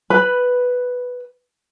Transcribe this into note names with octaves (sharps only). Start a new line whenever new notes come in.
B4 B5